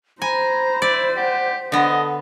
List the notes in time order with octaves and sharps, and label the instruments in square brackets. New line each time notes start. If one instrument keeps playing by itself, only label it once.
[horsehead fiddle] C5 [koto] G#5 [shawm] A#5 [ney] B5
[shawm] E4 [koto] D5
[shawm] G4 [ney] F#5
[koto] D3 B3 [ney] A4 [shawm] D#5